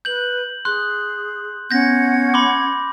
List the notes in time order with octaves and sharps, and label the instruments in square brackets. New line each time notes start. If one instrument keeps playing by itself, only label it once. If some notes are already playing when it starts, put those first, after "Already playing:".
[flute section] B4 [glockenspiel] G6 F#7
[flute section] G#4 [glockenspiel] C6 F#6
[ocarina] B3 [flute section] C#4 F#5 G#6 [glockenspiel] G6 A#6
[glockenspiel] B5 C6 D6